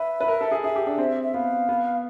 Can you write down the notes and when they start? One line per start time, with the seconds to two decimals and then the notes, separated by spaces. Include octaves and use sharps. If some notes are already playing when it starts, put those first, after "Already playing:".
Already playing: B4 E5
0.21 B4
0.28 A#4
0.41 A4
0.51 G#4
0.64 G#4 E5
0.76 G4
0.87 D4
0.98 C4
1.24 E5
1.34 B3 F5
1.69 B3